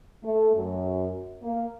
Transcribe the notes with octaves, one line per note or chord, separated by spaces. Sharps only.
A3
F#2
A#3